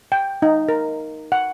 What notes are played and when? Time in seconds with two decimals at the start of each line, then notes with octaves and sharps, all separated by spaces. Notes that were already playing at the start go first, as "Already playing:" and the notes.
0.12 G5
0.42 D#4
0.69 A#4
1.32 F#5